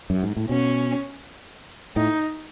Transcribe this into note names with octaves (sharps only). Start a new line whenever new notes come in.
F#2
G#2
A2
B2 C#4
A2 D#4